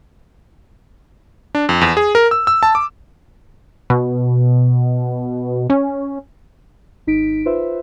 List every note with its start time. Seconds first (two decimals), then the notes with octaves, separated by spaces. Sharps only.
1.55 D4
1.69 F2
1.81 E2
1.97 G#4
2.15 A#4
2.31 E6
2.47 E6
2.63 A5
2.75 D6
3.90 B2
5.70 C#4
7.07 G#1 D#4 B6 D7
7.45 F4 B4 C5 E5